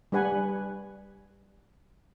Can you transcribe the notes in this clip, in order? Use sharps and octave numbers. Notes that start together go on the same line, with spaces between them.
G3 D4 B4 F#5 G#5